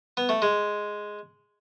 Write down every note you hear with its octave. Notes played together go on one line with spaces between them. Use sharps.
B3
A3
G#3